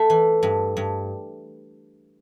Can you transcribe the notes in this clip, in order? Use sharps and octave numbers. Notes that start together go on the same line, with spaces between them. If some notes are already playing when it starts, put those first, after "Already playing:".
Already playing: A3
E3
G2
G2